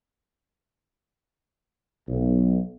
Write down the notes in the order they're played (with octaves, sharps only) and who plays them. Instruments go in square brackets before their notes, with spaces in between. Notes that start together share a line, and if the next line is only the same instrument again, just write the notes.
[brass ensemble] B1